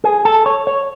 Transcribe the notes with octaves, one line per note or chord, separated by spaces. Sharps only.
G#4
A4
C#5
C#5